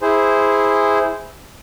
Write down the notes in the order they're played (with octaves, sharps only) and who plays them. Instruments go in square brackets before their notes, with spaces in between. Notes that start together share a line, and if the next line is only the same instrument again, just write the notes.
[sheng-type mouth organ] E4 G#4 C5